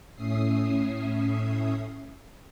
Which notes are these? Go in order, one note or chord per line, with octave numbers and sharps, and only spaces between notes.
A2 C#4 E5 D#6 C7